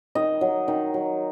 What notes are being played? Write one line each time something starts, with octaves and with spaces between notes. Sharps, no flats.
D#3 D#5
F#3
D#3
F#3